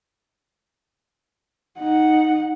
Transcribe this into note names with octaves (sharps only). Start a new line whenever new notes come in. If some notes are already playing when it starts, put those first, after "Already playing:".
D#4 F#5